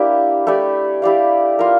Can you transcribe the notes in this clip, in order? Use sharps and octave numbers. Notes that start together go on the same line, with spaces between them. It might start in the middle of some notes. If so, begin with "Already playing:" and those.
Already playing: A#3 D4 E4 G4 D5
A3 E4 G4 D5
E4 G4 D5 F5
A#3 F4 A#4